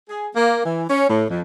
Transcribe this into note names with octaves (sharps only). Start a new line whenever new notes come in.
G#4
A#3
E3
C#4
A2
F2